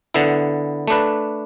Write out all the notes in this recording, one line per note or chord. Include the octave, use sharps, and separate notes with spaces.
D3 B3 E4
A3 D4 B4